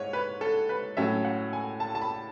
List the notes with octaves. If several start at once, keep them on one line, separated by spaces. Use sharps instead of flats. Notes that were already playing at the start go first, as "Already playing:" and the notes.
Already playing: G#2 C#5
B4
A4
B4
A2 F#3 C#4 E5
F#5
G#5
A5
A5
B5